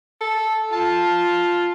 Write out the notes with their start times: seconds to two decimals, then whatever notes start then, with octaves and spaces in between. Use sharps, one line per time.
0.21 A4
0.72 F4 A5